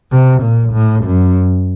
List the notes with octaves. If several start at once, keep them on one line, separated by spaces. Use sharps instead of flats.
C3
A#2
A2
F#2